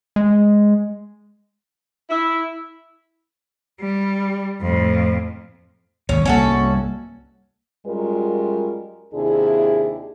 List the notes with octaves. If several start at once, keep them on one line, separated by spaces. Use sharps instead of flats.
G#3
E4
G3
F2 A2
G#1 D#2 G#2 C#4
C2 G3 A#3 C#4 F#4 A4
F#2 G3 G#3 F4 A#4
D#2 C3 D4 E4 G#4